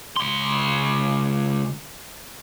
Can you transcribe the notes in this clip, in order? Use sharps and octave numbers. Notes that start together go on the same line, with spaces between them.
C#2 C6